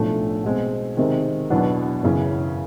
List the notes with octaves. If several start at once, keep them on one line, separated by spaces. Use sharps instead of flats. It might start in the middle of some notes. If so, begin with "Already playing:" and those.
Already playing: B1 A2 F3 A3 D4
B2 G#3 C4
C3 D#3 G#3 C4
E2 B2 F#3 B3 D4
F#2 C#3 E3